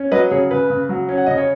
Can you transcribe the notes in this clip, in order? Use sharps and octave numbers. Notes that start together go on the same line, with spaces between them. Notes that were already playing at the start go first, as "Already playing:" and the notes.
Already playing: C#4
F#3 B4 D#5
C#3 G#4 C#5
C#3 B4
C#3
F#3
C#4
F#5
C#3 D#5
C#5